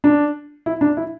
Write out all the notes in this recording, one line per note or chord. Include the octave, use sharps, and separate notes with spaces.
D4
E4
D4
E4